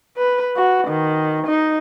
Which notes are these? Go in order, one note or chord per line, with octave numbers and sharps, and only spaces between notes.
B4
F#4
D#3
D#4